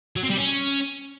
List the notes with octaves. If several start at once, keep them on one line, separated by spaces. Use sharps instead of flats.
F#3
C4
G3
C#4